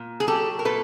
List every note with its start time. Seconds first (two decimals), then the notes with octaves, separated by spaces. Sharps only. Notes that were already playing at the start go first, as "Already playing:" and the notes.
Already playing: A#2
0.20 G#4
0.27 F#3 G4 A4
0.59 A#4
0.65 A#2 A4 B4